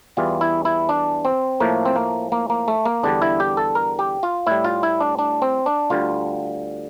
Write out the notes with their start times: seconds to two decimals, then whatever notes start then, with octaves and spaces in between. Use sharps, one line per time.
0.17 E2 E3 G3 F4
0.41 E4
0.65 E4
0.89 D4
1.25 C4
1.60 A2 F3 A3 A#3
1.85 C4
1.96 A#3
2.32 A#3
2.50 A#3
2.68 A3
2.85 A#3
3.03 E2 D3 G3 D4
3.22 E4
3.40 G4
3.57 A4
3.75 A#4
3.99 G4
4.23 F4
4.47 A2 G3 E4
4.64 F4
4.83 E4
5.00 D4
5.19 D4
5.42 C4
5.66 D4
5.90 D2 D3 G3 F4